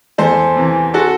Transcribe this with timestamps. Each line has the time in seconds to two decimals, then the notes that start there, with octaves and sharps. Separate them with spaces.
0.18 E2 A4 C5
0.56 C3 E3
0.94 F#4 A4